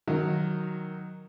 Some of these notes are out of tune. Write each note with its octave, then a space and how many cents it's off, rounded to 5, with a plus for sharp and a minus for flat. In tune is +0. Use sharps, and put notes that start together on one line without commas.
D#3 +0 F#3 +0